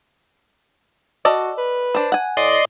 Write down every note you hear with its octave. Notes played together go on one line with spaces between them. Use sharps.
F#4 A4 D5 D#5
B4
D4 C5
F#5 G#5
A2 D5 D#5 C6